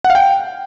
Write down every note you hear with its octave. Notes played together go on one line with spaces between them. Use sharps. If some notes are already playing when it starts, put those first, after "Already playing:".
F#5
F5
G5